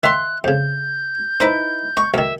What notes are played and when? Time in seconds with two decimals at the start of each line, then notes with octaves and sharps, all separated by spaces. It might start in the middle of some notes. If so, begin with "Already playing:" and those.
0.03 D#3 E5 F5 C6 F#6
0.44 F2 C#3 G6
1.40 D#4 E4 B4 C5
1.97 D#5 C#6
2.14 B1 D#3 A#3 E5